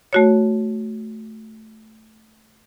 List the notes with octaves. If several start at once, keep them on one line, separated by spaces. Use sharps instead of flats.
A3 F#4 C#5